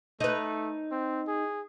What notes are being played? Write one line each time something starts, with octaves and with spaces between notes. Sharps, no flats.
A3 D#4 B4
C4
G#4